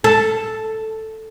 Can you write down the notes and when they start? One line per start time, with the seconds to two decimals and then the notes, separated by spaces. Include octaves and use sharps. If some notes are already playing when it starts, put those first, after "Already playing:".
0.04 A4